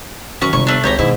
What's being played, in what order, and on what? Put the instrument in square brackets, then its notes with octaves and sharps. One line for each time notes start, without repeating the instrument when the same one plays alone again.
[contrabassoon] F#2 [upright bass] D#3 [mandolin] C#4 C#6 F#6
[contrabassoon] G1 [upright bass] C3 B3 [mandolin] C#6
[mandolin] A3 D4
[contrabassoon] G#1 [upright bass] C#2 [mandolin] G4 C#5 A#5
[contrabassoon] G#2 [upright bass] B2 D#3 [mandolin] E4